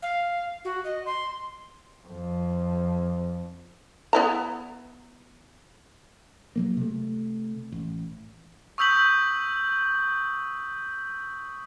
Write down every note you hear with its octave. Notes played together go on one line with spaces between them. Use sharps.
F5
F#4
D#5
C6
F2
B3 E4 A#5
F#3 G3 A#3
C3 A3
A1
C#6 D#6 E6 G6 B6 F#7